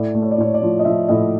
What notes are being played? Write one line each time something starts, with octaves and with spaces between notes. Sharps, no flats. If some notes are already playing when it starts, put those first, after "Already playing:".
Already playing: A2 D5
A3
C#5
D5
A2 C#5
D5
F3
D#5
F3 E5
A2 D#5